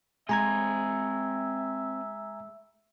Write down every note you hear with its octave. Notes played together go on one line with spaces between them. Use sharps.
G#3 C4 D#5 E5 G#5 A#5 G#6